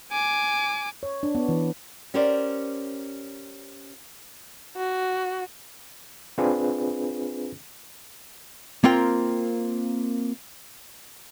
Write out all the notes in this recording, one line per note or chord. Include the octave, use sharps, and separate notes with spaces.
G#5 D6
C#5
D4
B3
E3
C#4 G4 A#4 C5 D5
F#4
C4 D4 F4 G#4 B4
A#3 C4 F4 A#4 G5